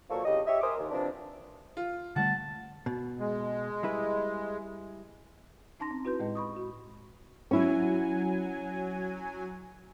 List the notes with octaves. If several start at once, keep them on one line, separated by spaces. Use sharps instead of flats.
A#2 F3 F#3 A#3 A4 C#6
C2 C#3 G4 D#5
G4 C#5 D#5 E5
A#4 E5 G#5 C6 D6 D#6
D#2
C3 E3 F3 G3 D4
F4
D3 G3 A3 F#5 A5
B2
G#3
G3 E4 B4
C#4 D#4 A5 C6 A#6
C4
E4 F#4 B4 C6 G6
A2 G#3 D#5
B5 C#6 D#6
F#4
F#3 C#4 E4 G#5